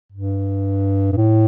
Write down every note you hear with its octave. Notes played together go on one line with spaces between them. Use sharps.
G2
G2
A2